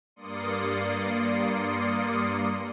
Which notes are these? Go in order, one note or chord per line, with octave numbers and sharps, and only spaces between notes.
G2 A#3 D5 C6 D#6 C#7